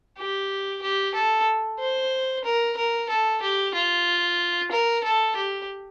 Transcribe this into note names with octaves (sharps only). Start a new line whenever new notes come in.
G4
G4
A4
C5
A#4
A#4
A4
G4
F4
A#4
A4
G4